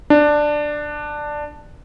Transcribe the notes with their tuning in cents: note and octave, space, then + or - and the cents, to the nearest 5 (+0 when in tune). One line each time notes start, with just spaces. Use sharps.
D4 +10